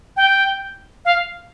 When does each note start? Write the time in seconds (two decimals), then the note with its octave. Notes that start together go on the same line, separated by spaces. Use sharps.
0.17 G5
1.05 F5